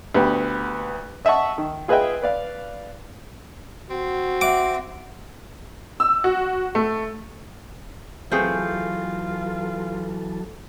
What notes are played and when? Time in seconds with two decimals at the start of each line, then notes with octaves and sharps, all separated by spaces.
0.14 D2 B3 G4 B4
1.25 D#5 E5 F#5 A5 C#6
1.58 D#3
1.88 F4 G#4 B4 D#5 E5 G5
2.22 B4 D5 F5
3.90 C4 F#4
4.41 E5 F#5 D6
6.00 E6
6.24 F#4
6.75 A3
8.32 E3 F#3 A3 C4 F4 G#4 A4